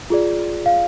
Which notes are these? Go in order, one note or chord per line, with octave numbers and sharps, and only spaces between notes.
F4 G#4 D5
F5